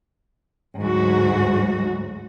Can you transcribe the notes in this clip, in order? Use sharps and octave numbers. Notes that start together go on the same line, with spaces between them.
D2 G#2 F#3 F#4